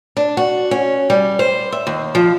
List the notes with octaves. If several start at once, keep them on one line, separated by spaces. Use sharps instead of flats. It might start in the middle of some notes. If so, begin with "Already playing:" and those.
D4
F#4
C#4
G3
C5
E5
D#2
F3